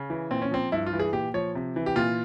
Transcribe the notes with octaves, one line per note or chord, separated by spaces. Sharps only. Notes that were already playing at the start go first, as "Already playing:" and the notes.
Already playing: C#3
E3
A#2 C4
C#4
F3 C4
G2 E4
F4
E3
G#4
A#2 G4
F3 C#5
C3
E3
G4
A#2 F4